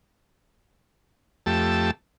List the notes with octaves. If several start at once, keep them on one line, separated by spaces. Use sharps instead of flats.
F2 A3 G4 A5 E6